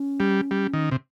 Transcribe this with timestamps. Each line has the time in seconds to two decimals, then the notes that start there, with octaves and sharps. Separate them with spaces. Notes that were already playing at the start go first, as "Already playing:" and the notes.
Already playing: C#4
0.20 G3
0.51 G3
0.73 D#3
0.91 C3